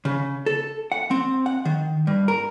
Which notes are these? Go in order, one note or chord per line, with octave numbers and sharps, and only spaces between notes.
C#3
A4
F#5
C4
F#5
D#3
G2
A#4